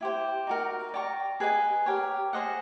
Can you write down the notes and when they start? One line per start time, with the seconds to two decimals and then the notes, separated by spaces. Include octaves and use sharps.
0.01 E4 G4 C5
0.47 D#4 F#4 A#4
0.94 D5 G5 A#5 C#6
1.40 G#4 B4 D#5 G#5
1.86 G4 A#4 C#5
2.33 G#4 C5 D#5 F#5